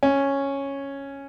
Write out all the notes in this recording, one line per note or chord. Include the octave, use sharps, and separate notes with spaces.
C#4